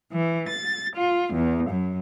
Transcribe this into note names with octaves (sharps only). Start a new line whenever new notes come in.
E3
A6
F4
E2
F#2